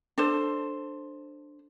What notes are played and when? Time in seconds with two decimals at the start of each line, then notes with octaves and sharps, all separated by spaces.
0.18 D4 A4 C5